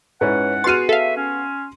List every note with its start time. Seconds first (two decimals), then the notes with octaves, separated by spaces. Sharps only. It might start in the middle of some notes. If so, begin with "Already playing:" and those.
0.21 G#2 C#4 E4 B4 C#5 F#5
0.64 B3 F#4 G#4 C6 F6 A6 C7 D#7
0.89 A4 E5 F5
1.17 C#4